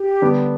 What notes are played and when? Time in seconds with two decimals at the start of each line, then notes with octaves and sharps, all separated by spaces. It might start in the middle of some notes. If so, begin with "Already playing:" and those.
Already playing: G4
0.21 D3 G3 B3 D4